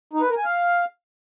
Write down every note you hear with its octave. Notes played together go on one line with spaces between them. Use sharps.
D#4
B4
A#4
G#5
F5